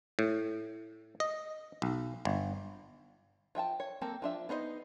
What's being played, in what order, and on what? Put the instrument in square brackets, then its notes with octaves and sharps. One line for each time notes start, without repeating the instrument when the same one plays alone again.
[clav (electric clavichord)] A2
D#5
B1
G1
[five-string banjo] F3 E5 G5 A5
C#5
A#3 C4 A4
F3 D4 E5
B3 D#4 C5 C#5 D#5